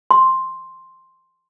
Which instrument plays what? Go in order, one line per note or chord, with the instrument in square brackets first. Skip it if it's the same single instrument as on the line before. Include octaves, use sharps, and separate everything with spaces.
[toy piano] C6